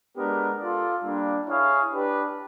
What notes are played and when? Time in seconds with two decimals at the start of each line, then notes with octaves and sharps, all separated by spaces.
0.15 G#3 B3 D4 G4 A#4
0.59 F4 A4 D5
1.03 G3 A#3 D4
1.46 E4 G#4 C#5 F5
1.90 D4 G4 B4